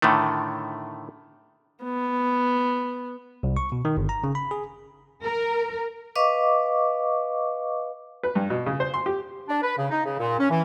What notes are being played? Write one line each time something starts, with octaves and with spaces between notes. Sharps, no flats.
A2 D3 D#3 A3
B3
C2
C#6
B2
D#3
G1
A#5
C#3
B5
G#4
A#4
B4 D#5 F5 C#6 D6
B4
G2
B2
C#3
C5
C6
G4
D4
B4
C#3
D#4
C#3
A#2
C#4
E3